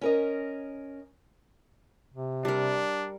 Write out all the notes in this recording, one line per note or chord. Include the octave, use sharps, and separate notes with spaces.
C#4 A#4 D#5
C3
G3 D4 A#4